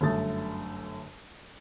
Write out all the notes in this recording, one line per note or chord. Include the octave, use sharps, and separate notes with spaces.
G1 F#2 D3 A3 D#6 A6